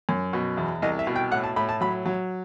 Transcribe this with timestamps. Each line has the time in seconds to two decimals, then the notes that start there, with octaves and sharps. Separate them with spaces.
0.09 F#2
0.33 B2
0.57 E2
0.82 C2 D#5
0.99 E5
1.07 B2
1.16 G5
1.32 A2 F#5
1.43 A5
1.56 A2 B5
1.69 A5
1.81 F#3 B5
2.06 F#3